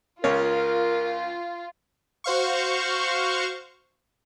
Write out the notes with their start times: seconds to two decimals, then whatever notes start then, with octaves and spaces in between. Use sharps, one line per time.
0.24 C#2 C#3 F4 A#4 C#5
2.24 F#4 C5 F5 C#6